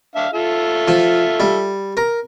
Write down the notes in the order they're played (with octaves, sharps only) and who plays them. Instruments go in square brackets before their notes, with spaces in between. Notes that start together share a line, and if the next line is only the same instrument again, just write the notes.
[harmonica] D4 E5 F5
F4 A4 E5
[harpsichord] F3
G3
A#4